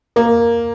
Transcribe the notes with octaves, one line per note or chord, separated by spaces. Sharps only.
A#3 A#4